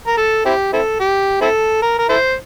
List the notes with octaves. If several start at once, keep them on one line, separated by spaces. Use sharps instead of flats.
A#4
A4
C4 E4 G4
C4 E4 A4
G4
C4 E4 A4
A#4
A#4
E4 A4 C5